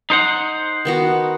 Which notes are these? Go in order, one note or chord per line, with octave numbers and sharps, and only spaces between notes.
D#4 C5 F#5
D#3 B3 F#4